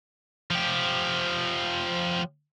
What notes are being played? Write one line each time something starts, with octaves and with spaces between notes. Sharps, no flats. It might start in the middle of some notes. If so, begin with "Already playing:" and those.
F3 G4